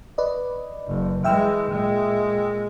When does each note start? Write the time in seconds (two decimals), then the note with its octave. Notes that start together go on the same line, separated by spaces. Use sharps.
0.18 B4 D5 D#5
0.87 F#1
1.24 E3 G#3 E5 G5 E6
1.71 A#2 G#3